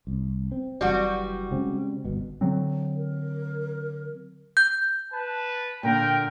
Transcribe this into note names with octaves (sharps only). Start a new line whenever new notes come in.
C2
C4
F#1 E3 G3 F#4
C#3 G#3 C4
G1 B2
D3 F#3 C4
A#4
G6
B4 A5
A#2 D3 A#4 G5